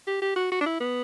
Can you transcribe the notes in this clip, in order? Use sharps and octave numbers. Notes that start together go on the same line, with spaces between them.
G4
G4
F#4
F#4
D4
E4
B3